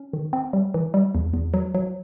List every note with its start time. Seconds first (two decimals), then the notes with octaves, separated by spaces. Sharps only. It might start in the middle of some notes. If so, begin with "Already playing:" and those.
Already playing: C#4
0.13 D#3
0.33 C4
0.53 G3
0.74 E3
0.94 G3
1.15 E2
1.34 E2
1.54 F#3
1.75 F#3